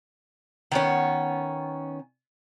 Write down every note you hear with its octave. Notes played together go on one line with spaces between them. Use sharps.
D#3 B3 C#4